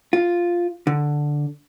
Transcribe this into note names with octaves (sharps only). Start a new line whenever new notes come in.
F4
D3